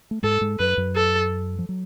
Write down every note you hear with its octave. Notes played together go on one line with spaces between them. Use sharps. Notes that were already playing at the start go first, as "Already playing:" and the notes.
A3
G#2 G#3 A4
G#2 G#3
F#2 F#3 B4
F#2 F#3
A4
F3
F#3